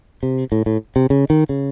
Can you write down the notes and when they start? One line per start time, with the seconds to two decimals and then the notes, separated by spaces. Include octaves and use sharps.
0.23 C3
0.52 A2
0.66 A2
0.96 C3
1.10 C#3
1.30 D#3
1.49 C#3